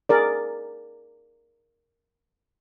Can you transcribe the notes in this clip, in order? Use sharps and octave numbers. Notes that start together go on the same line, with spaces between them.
G#4 A#4 D5